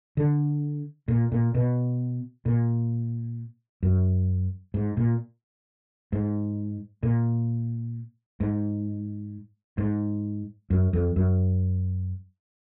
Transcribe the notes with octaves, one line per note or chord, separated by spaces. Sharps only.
D3
A#2
A#2
B2
A#2
F#2
G#2
A#2
G#2
A#2
G#2
G#2
F#2
F2
F#2